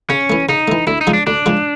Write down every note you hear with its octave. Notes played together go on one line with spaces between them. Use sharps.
C#3 C#4
E3 A3
C#3 D#4
E3 A3
D2 E4
D#4
C#3 F3 G#3
D4
D2 D4
C#3 F3 G#3